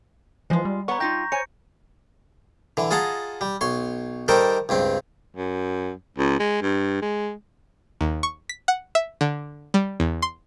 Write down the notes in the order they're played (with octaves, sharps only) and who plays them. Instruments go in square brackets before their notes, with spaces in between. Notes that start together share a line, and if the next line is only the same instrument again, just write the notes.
[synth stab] E3 F3 [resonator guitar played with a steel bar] G#3 F4
[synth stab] G3
[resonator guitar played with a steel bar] B3 C#5 F#5 [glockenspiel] A#5 C#6
[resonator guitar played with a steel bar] D#4 F4 G5 [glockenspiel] G6 A#6
[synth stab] C5 [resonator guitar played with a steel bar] C#5 G#5 [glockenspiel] C#7
[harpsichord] D3 E3
F4 G#4 D#5 F#5 A5 A#5
G3
B1 C#5 C6
D#3 G3 A4 A#4 C5 G5
C#2 G2 C4
[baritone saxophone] F#2
C#2
G#3
G2
G#3
[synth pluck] D#2
C#6
B6
F#5
E5
D3
G3
E2
C6